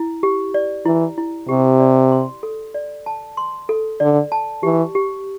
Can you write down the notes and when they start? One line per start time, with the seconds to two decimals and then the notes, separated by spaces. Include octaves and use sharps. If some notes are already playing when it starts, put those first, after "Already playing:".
Already playing: E4
0.23 G4
0.54 D5
0.85 E3 E4
1.18 E4
1.49 C3 G4
1.80 D5
2.12 C6
2.43 A4
2.74 D5
3.06 A5
3.37 C6
3.69 A4
4.00 D3 D5
4.32 A5
4.63 E3 G4
4.95 G4